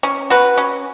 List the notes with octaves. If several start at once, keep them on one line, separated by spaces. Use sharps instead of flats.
C#4
F#4 B4
C#4